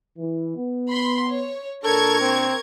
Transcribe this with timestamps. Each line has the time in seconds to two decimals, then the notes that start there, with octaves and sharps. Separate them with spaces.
0.19 E3
0.56 B3
0.89 B5 C6
1.30 C#5
1.84 A#2 D4 A4 A#4 C#6 G#6
2.21 C4